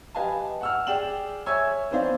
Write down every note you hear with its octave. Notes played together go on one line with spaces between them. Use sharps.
G4 B4 D#5 F5 G#5 A5
F#5 E6 F6
G#4 D5 G5 E7 F#7
C#5 E5 G#5 C#6 E6 G#6
B3 C4 D#4 C5 D5 F5